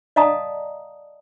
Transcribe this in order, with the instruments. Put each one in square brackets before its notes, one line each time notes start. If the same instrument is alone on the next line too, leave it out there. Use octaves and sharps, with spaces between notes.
[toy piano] D5 D#5 F5 A5 A#5 D#6